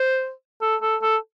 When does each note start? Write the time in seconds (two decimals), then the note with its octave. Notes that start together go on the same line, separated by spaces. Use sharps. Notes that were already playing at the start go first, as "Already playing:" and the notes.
Already playing: C5
0.62 A4
0.82 A4
1.02 A4